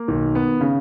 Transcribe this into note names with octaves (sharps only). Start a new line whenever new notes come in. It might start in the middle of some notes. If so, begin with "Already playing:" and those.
Already playing: A#3
B1 D#3
B3
C#3